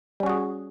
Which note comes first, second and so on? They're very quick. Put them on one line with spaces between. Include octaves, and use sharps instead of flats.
G3 C#4 F#4 G#4